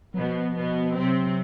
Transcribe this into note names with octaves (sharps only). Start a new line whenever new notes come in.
F#3
B2 F3 B3
B2 B3
C3 F#3 C4